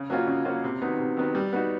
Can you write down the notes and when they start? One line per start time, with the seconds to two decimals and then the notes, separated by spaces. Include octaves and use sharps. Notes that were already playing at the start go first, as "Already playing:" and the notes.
Already playing: C#3
0.10 F#3 A#3 C#4 F4
0.27 C#3
0.45 F#3 A#3 C#4 F4
0.64 C3
0.81 D#3 F#3 B3 D#4
0.99 C3
1.17 D#3 F#3 B3 D#4
1.35 G3
1.53 B3 D#4 F#4